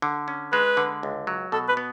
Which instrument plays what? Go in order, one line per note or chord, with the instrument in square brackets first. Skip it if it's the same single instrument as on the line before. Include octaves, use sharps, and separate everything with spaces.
[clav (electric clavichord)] D3
C#4
[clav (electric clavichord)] G#3 [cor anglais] B4
[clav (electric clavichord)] D3
C#2
F#3
[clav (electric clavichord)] B2 [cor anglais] A4
[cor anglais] B4
[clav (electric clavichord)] B3